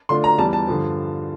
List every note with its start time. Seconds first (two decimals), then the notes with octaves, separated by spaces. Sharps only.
0.09 D3 A3 D4 F4 C6
0.24 A#5
0.38 E2 E3 G3 A5
0.53 A5
0.67 G2 D3 F3